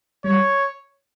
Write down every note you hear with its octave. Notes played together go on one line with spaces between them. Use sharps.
G3 C#5